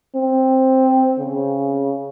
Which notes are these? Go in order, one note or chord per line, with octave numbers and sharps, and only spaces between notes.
C4
C#3